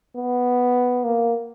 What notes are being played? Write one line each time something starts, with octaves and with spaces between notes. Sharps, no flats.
B3
A#3